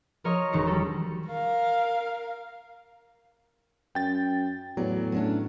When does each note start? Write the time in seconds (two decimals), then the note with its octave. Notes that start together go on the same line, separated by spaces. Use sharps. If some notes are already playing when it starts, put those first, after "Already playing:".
0.24 F3 A#4 C#5 D#5
0.52 E1 D#3 A#6 C#7
0.67 G3 A4
1.29 A#4 F5
3.95 F#2 G5 A6
4.77 E2 A2 F#3 B3 D5
5.12 A3 C#4 D4